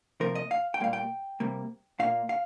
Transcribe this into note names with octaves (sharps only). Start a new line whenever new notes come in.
C3 F3 A#3 A#4
D#5
F5
G5
A#2 G3 A#3 F5
G5
C3 G3 A#3
A#2 A#3 F5
F5